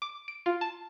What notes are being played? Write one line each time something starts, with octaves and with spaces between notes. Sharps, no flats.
D6
D7
F4
A5